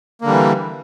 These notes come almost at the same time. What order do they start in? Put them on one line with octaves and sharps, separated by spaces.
A#3 D3 G3 E3